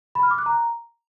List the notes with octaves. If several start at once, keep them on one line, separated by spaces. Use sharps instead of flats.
B5
F6
D6
F#6
A#5